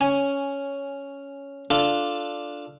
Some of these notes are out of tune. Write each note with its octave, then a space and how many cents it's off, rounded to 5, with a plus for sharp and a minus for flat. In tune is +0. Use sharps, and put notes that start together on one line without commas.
C#4 +5 G#5 +0
D4 +0 F4 +0 A4 +0